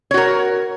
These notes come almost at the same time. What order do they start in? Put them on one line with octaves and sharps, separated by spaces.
C#5 F#4 A#4